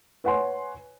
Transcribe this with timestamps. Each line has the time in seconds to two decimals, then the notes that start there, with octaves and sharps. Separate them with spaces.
0.24 B4 C#5 F#5 G#5 C6